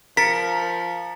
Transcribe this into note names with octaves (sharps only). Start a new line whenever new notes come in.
F3 A#4 A#5 A6 B6 C#7